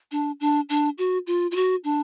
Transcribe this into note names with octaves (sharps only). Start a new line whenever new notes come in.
D4
D4
D4
F#4
F4
F4
F#4
D4